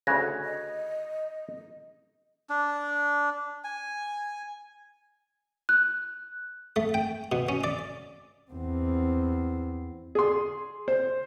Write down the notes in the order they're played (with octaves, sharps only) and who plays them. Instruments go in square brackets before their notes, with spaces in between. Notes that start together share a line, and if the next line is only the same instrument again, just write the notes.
[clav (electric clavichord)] D2 C#3 [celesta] F#6 G#6 A#6
[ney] D#5
[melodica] D4
G#5
[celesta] F#6
[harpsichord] A3
G5
B2
C#4
D5
[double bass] E2 C4
[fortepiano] G#4 C6
C5